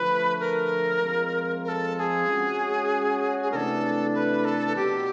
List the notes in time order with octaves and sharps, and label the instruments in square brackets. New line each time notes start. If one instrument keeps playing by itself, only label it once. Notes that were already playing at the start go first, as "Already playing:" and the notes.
Already playing: [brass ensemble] D3 F3 A3 [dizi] B4
[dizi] A#4
[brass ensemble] F3 G#3 C4 F4
[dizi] A#4
A4
A4
G#4
[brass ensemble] G#3 C#4 F#4
[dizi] G#4
[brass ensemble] C3 E3 A3 D4 [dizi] A4 A#4
[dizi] B4
A4
[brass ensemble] E2 B2 F#3 [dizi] G4